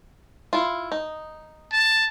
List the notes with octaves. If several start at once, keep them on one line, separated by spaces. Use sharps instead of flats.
E4 F4
D#4
A5